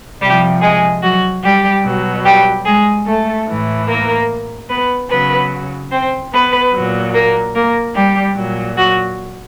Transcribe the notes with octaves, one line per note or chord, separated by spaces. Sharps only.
C3 F3 G3 G4
G#3 G#4
F#3 F#4
G3 G4
B2 F#3
G3 G4
G#3 G#4
A3 A4
A2 E3
A#3 A#4
B3 B4
C#3 F#3 B3 B4
C4 C5
B3 B4
A#2 F#3
A#3 A#4
A#3 A#4
G3 G4
A#2 F#3
F#3 F#4